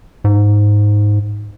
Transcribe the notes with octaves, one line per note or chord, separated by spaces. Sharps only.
G#2